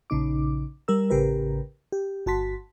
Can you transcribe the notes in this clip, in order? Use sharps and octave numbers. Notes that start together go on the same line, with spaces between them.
A#1 C#3 D#4 D6
G3 A#4 E6
A1 C#3 G4 A#4 B4
G4
G1 F#4 A5 C6 B6